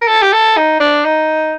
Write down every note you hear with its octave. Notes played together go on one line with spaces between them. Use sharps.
A#4
A4
G4
A4
D#4
D4
D#4